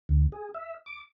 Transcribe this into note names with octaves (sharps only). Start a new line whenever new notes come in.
D2
G#4
E5
D6